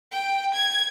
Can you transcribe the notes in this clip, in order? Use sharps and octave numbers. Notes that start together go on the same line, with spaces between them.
G5
G#6